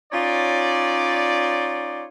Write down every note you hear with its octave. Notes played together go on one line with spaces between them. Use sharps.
C#4 D#4 F4 C#5 D5